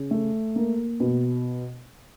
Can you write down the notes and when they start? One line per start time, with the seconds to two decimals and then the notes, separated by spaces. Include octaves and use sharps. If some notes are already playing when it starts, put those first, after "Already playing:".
Already playing: C#3
0.11 A3
0.56 A#3
1.00 B2